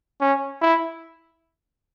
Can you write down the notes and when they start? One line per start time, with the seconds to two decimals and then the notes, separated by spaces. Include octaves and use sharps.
0.21 C#4
0.62 E4